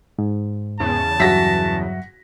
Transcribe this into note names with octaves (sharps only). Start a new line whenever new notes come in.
G#2
E2 C#3 A5
G2 F#3 F#4 E5 A#6 B6